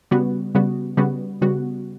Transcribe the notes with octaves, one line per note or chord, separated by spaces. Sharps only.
C#3 G3 B3 F#4
C#3 G3 B3 F#4
C#3 G3 B3 F#4
C#3 G3 B3 F#4